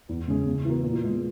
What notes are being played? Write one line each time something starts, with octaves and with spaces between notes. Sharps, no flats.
E2
C#3 G#3 C#4 G#4
C#3
E3 B3 F#4 A#4
A#2
G#3 B3